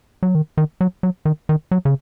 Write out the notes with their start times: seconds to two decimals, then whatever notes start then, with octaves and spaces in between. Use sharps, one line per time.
0.23 F#3
0.35 D#3
0.58 D#3
0.81 F#3
1.03 F#3
1.25 D#3
1.49 D#3
1.71 F#3
1.85 C#3